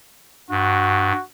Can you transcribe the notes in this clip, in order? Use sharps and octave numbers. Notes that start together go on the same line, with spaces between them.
G2 F#4